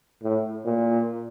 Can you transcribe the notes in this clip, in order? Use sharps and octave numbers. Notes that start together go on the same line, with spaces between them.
A2
A#2